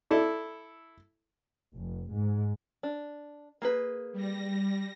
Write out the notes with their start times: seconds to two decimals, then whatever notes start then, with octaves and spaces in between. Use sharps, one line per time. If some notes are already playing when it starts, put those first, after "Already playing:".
0.11 E4 A4 D5
1.75 F1
2.11 G#2
2.83 D4
3.62 A#3 G#4 B4
4.13 G3 A#6